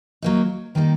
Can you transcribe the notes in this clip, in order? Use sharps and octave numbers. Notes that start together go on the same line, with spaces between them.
F#3 A#3 D#4
D#3 G3 A#3 D#4